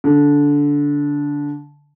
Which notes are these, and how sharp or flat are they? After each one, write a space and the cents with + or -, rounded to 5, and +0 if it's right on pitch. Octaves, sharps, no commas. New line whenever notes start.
D3 -15